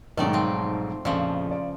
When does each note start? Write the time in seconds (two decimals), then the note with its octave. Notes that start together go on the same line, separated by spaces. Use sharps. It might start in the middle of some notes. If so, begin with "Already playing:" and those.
0.17 B1 G#2 D#3 A3 D5
0.33 F3 C4
1.05 A#1 F2 C#3 F3
1.51 D5